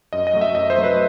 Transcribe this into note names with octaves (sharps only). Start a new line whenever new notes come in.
F#2 D#5
D#5
F#3 A3
E5
F#2 D#5
C5
F#3 A3
B4